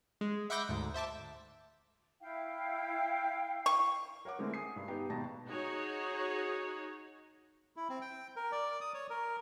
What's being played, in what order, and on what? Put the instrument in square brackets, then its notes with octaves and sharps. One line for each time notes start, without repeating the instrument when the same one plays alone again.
[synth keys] G#3
E5 F#5 B5 D6 G6 A#6
D2 G#2
C5 E5 A5 D6
[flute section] E4 F5 G5
[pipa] C#6
[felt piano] A#4 C#5 F#5 D6
D3 G#3 A3 C4 E4 A#4
G#5 D#6 C7
G2
B3 D#4 G4
G#1 B2 A5 A#5 A#6
[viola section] D#4 F#4 G#4 C#5
[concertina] E4
C4
G5
A#4
D5
D#6
C#5
A#4